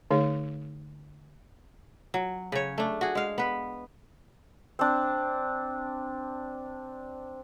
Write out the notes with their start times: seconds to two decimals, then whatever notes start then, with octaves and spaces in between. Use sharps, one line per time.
0.11 D3 A3 D#4 G#4 C#5
2.14 F#3
2.52 C#3 C#5
2.78 A3 D4
3.01 F#4 G#4
3.15 G#3 F5
3.38 B3 B4
4.79 C4 D4